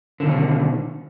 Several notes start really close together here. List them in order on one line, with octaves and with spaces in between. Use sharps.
D3 D#3 B2